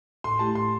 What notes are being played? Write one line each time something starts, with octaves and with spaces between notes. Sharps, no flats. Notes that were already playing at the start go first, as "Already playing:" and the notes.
A2 C6
A3 E4 G4 A5
A2 C6